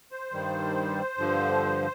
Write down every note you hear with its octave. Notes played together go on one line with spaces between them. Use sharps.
C5
G2 D#3 G3
G2 D3 F3